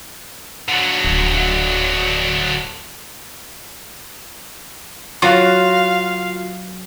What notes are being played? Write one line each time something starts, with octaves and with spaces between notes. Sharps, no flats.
D3 F#3
D1
F#3 F4 F#4 F5